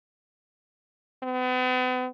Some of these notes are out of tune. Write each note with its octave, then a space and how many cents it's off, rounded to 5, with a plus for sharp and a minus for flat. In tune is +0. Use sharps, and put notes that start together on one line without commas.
B3 +40